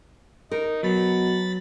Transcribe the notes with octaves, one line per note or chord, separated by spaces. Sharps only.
D#4 A#4
B2 F#3 B5 A6